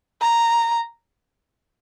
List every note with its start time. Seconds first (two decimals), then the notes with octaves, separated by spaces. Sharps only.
0.22 A#5